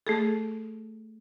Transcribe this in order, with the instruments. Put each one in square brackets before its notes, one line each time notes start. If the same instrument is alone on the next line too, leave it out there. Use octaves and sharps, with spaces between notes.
[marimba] A3 G#4 A4